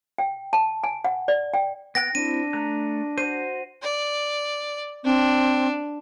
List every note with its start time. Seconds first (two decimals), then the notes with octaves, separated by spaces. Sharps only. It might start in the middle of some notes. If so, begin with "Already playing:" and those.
0.18 G5
0.53 A5
0.84 G#5
1.05 F#5
1.28 D5
1.54 G5
1.95 B3 G5 F#6 A#6
2.15 C4 D4 E4 D#7
2.53 A3 A#5 F#6
3.18 F#4 C5 D#7
3.83 D5
5.04 C4 D4